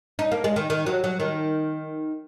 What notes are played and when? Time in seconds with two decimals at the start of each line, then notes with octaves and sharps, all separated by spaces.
0.19 D#4
0.32 A#3
0.44 G#3
0.56 D#3
0.70 D#3
0.86 F#3
1.04 F#3
1.20 D#3